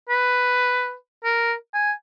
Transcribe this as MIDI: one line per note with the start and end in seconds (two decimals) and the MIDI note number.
0.09 0.94 71
1.24 1.54 70
1.74 1.92 80